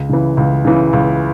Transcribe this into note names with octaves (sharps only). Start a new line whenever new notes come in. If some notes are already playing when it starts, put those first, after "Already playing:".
Already playing: C#2
C#3 E3
C#2
C#3 E3
C#2